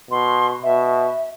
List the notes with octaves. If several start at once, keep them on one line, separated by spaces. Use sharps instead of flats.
B2 C6
B2 E5